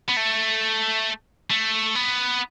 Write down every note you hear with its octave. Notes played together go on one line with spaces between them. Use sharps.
B3
A3
A3
B3